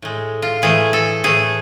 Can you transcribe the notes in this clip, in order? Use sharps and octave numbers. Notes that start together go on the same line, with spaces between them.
A2 G#3
F4
A2 E3 A3 G#4
A4
A2 E3 A3 G#4